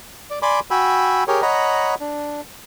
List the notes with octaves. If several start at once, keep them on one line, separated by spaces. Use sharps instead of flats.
D5
D5 G#5 B5 C6 D6
F#4 G5 G#5 B5 E6
G4 G#4 A#4 C#5
C#5 D#5 F#5 A#5 B5
D4